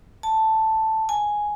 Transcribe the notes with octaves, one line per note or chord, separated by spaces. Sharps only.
A5
G#5